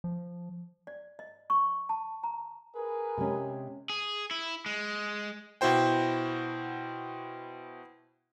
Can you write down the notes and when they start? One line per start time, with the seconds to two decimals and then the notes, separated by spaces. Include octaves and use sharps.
0.04 F3
0.87 D5
1.19 D#5
1.50 C#6
1.89 A5
2.23 A#5
2.75 G#4 A#4 B4
3.17 C3 G#3 C#4
3.90 G#4
4.31 E4
4.66 G#3
5.61 B2 E4 F#4 C5 G5